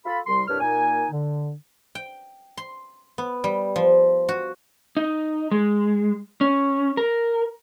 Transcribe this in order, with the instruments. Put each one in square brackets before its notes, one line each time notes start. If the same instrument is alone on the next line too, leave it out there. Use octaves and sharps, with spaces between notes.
[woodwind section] F4 A4 B5
C2 G3 C6
C2 G2 D4 B4 C#5 F6
A#2 A#3 D#4 G#5
D3
[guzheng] G5
C6
B3
G3
F3
F#4
[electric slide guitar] D#4
G#3
C#4
A#4